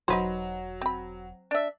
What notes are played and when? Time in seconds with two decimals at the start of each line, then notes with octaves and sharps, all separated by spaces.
0.08 E1 F#3 D#4 B4 C5
0.81 C4 B5
1.51 D4 E5